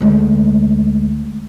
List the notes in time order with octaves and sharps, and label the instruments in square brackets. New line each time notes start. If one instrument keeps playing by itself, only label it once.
[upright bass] D2 G#3